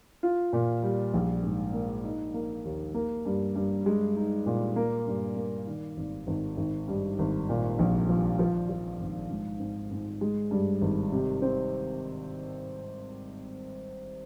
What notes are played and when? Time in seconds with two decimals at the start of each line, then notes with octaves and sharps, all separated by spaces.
0.23 F4
0.53 A#2
0.83 G3
1.14 A#1
1.43 G#2
1.73 A#3
2.04 D#4
2.34 A#3
2.65 D#2
2.94 A#3
3.26 G2
3.56 G2
3.86 G#3
4.16 D#4
4.46 A#2
4.76 A#3
5.07 G2
5.37 A#3
5.67 D#3
5.97 G#1
6.27 G#1
6.57 G#1
6.88 G2
7.19 G#1
7.49 A#2
7.79 A#1
8.09 F3
8.39 F3
8.69 F3
9.00 G#1
9.30 G#2
9.60 G#2
9.91 G#2
10.21 G#3
10.51 G2
10.81 G#1
11.12 C3
11.42 C4